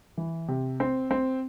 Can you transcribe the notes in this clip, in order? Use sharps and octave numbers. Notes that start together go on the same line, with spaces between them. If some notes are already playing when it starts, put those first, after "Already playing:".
E3
C3
C4
C4